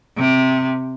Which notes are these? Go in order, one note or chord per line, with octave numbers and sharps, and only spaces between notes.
C3